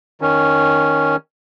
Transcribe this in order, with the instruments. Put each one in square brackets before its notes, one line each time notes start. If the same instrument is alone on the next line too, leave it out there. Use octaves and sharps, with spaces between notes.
[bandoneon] D#3 C#4